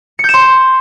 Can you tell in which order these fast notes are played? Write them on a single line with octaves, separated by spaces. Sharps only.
C#7 G6 E7 C6